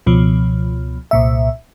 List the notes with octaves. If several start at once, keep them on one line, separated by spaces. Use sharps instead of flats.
C#2 B2 F3
C2 A#2 E5